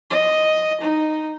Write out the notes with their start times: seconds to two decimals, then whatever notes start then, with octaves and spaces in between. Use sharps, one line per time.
0.10 D#5
0.82 D#4